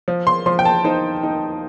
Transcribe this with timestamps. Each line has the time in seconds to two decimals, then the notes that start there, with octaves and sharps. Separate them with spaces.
0.08 F3
0.27 C6
0.46 F3 C6
0.59 G5
0.65 A5
0.84 D#4 C5
1.23 D#4